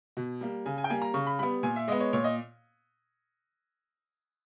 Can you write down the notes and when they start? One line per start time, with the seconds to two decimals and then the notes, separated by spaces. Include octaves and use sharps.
0.17 B2
0.41 G3 A#3
0.66 C#3 G#5
0.78 G#5
0.84 G5
0.90 G3 A#3 G#5
1.02 A#5
1.14 C#3 C#6
1.27 B5
1.39 G3 B3 B5
1.63 A#2 G#5
1.76 E5
1.88 G#3 B3 D#5
2.00 C#5
2.13 A#2 C#5
2.24 D#5